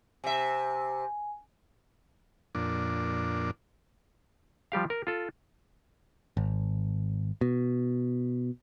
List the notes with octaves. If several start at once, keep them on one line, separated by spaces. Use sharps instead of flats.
C3 E5 G#5
F2 A#2 D4
F3 G3 G4 F5
A#4
F4 A4
G#1
B2